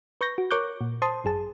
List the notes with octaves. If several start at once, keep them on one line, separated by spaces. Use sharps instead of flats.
B4 C#6 G6 A#6
F#4
A#4 C#5 C#6 D6 F#6 G6
A#2
C5 A5 C6 D#6
G#1 F#2 G#4 A5